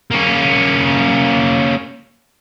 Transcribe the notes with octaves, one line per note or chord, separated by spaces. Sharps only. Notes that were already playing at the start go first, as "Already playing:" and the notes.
A#3 C#4